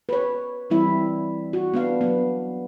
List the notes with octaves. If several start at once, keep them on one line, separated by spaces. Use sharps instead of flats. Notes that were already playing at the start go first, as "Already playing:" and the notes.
B4 C#5
E3 G3 C4 E4 E5
F#4
B3 D4 F5
F#3 B3